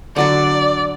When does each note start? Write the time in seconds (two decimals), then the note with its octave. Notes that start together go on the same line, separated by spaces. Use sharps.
0.16 D3 F#3 D4 D5